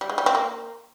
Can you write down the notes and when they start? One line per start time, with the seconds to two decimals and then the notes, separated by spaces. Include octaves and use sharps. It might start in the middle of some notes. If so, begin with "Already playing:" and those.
0.01 G3
0.09 G#3
0.18 G3
0.26 C4
0.35 A#3